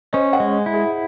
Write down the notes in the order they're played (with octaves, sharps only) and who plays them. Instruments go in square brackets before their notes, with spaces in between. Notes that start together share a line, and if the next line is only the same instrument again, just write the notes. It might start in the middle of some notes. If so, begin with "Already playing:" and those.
[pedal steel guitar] C#4 [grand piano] C5 D#5
[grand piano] D#5 F#5
[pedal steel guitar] G#3
E4
[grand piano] G#4